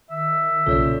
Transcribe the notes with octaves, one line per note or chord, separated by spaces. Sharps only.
D#3 E5
B1 A#2 C#3 F4 A4 C#5 D5